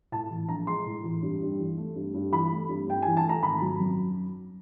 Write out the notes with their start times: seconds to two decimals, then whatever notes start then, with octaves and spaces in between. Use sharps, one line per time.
0.12 A2 A5
0.30 E3
0.49 A#1 A#5
0.67 G#3 C6
0.86 A2
1.04 E3
1.22 G2
1.41 G2
1.59 E3
1.77 A3
1.96 G2
2.14 G2
2.32 E3 B5
2.51 A3
2.69 G2
2.87 G2 G5
3.02 E3 G#5
3.17 A5
3.25 A3 A#5
3.42 G#1 B5
3.61 F#3
3.80 F#2